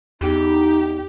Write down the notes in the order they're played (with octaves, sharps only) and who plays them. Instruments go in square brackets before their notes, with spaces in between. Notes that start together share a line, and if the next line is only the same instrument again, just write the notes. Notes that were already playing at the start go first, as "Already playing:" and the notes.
[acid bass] E2 [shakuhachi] D#4 [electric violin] G4